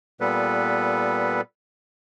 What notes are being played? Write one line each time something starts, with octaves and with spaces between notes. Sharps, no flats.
A#2 G3 B3 A4 B4